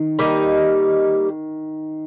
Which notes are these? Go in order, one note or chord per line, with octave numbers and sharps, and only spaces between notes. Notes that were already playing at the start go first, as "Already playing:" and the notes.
Already playing: D#3
G3 A#3 D#4 G4